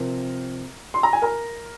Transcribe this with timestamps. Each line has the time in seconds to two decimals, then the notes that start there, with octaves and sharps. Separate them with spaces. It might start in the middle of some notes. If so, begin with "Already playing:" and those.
Already playing: C3 F3 C4 A#4
0.94 C6
1.03 A#5
1.13 G#5
1.22 A#4 A#5